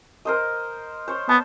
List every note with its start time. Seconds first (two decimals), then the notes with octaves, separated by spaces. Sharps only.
0.25 A#4 C5 D#5
1.08 C5 C#5
1.29 B3 A5